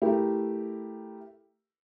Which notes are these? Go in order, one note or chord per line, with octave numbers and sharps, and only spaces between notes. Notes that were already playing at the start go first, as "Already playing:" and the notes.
A3 E4 G4 A#4